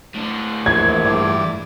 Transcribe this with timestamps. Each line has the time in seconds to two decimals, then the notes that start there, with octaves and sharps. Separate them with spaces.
0.15 A2 D4
0.66 A#1 E3 G#6
1.04 G2 E3 D5